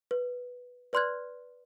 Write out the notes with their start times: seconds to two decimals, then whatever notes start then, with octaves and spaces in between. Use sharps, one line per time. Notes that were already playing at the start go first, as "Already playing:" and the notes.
0.11 B4
0.93 B4 D5 C6 F6 F#6 G#6